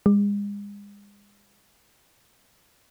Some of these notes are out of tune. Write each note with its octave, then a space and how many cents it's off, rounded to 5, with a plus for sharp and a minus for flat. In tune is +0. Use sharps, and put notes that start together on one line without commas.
G#3 -40